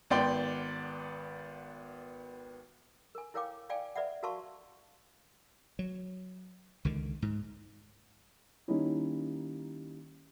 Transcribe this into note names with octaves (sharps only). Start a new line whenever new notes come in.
G#1 B3 D5 G5 C6
A#4 G#5
E4 A#4 C#5 F5 G5 D6
D5 F5 G5 G#5
B4 D5 E5 F#5
F#4 A#4 F5 A5 C6 C#6
F#3
C#2 D3 D#3
G#2
D#3 G3 A#3 C#4 D#4 E4